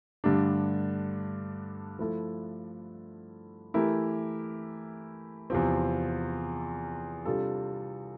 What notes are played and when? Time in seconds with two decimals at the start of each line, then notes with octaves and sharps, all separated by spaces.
0.24 G2 D3 A3 D4 G4
1.99 F3 A3 E4 A4
3.74 E3 A3 E4 G4 A#4
5.50 E2 C3 F3 C4
7.25 C3 G3 D4 F4 A4